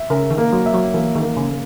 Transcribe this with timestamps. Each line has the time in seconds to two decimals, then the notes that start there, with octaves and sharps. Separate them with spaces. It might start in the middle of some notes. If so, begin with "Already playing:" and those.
Already playing: E5
0.10 C#3 A#4
0.31 D#3
0.38 A#3
0.52 F#3
0.66 E5
0.74 F#3
0.94 E3 A#3
1.15 D#3
1.22 A#3
1.37 C#3
1.50 A#3